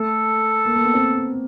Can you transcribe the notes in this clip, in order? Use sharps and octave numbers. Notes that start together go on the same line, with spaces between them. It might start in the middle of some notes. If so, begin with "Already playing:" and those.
Already playing: A3 A4
A#3
A#3
B3
C4